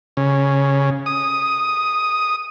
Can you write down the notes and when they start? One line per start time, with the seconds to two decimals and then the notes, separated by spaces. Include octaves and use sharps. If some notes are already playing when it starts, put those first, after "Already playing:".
0.17 C#3
1.06 D#6